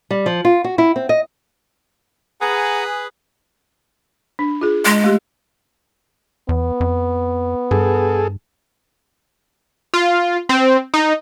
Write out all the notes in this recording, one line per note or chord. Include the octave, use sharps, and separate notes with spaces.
G3
F3
F4
F#4
E4
C4
D#5
G#4 B4 F#5 G#5 A#5
D4
F4 G#4
G#3
A3 G4
E2 B3
F2
G2 G#4 A4
F4
C4
D#4